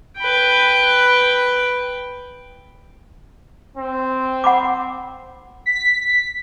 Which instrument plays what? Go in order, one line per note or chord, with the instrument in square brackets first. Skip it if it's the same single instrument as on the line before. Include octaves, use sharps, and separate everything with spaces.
[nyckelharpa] B4 G5
[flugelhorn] C4
[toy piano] F#5 B5 D6
[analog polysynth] B6